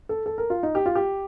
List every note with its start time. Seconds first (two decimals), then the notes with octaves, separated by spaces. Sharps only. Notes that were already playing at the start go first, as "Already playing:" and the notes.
0.09 A4
0.26 A4
0.38 A#4
0.50 F4
0.63 D#4
0.75 G4
0.86 F4
0.95 G4